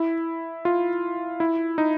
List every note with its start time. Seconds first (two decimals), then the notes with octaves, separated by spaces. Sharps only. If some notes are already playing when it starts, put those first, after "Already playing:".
Already playing: E4
0.65 F4
1.40 E4
1.78 D#4